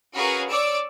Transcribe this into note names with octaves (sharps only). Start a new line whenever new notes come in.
C#4 F#4 G#4 A#4 B4 F5
C#5 D5 D6 E6 D7